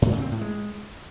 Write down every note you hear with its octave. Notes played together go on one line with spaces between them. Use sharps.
G#2
C#3
C4
A2
G#3